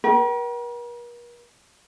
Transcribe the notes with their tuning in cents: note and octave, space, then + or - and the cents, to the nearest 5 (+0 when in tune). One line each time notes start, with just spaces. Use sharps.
A#4 +45 G5 -40